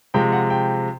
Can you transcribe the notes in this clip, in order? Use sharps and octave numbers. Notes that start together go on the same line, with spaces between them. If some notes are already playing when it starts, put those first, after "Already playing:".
C3 F3 G#3 G5
F#5
G5